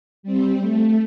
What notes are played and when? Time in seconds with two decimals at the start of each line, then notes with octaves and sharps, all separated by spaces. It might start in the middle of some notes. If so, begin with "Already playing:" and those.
0.23 G3 C4
0.60 A3